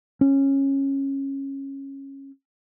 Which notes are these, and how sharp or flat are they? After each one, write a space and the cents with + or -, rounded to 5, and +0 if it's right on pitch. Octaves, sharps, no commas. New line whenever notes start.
C#4 -15